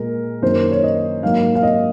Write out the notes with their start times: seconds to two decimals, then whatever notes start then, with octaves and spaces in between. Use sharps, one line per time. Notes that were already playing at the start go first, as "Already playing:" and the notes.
Already playing: A#2 G#3 A#4
0.42 F#2 D#3 A#3 C5
0.71 C#5
0.83 D#5
1.23 G#2 F#3 A#3 F5
1.55 F5
1.63 D#5